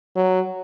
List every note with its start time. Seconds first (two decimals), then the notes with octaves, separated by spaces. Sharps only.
0.16 F#3